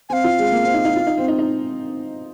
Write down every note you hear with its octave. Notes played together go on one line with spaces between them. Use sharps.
C4 F5 G#5
F4
G#3
A#3
C4
D#4
D#4
F4
D#4
C4
D#4
D#4